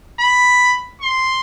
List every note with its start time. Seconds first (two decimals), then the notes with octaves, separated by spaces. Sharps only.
0.20 B5
1.01 C6